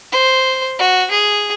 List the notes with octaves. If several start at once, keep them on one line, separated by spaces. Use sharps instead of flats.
C5
F#4
G#4